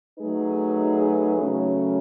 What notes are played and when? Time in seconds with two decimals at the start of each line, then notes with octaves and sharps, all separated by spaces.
0.19 F#3 A3 D#4 G#4 B4
1.38 C#3 F#3 A3 C#4